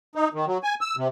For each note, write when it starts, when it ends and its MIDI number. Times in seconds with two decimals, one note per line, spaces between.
0.15 0.28 63
0.34 0.46 51
0.47 0.58 54
0.63 0.75 80
0.81 0.95 88
0.97 1.08 48